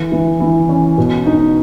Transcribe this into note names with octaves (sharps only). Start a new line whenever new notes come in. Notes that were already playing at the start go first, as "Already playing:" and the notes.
Already playing: E3
E3
E3
C#4
B2
D#4